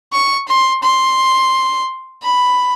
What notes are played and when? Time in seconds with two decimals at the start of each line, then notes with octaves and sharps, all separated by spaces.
0.13 C#6
0.48 C6
0.83 C6
2.23 B5